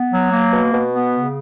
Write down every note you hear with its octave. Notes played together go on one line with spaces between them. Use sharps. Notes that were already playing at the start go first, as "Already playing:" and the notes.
Already playing: B3
F#3
A#3
B2
B2
B3
C#3